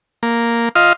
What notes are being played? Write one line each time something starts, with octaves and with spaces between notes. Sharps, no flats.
A#3
F4 D#5 F5